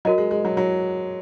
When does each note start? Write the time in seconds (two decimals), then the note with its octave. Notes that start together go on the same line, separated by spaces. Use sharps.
0.05 F#3 F#4 A#4 D#5
0.18 G#3
0.31 G#3
0.45 F#3
0.57 F#3